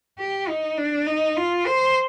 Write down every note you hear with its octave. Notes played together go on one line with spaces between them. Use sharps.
G4
D#4
D4
D#4
F4
C5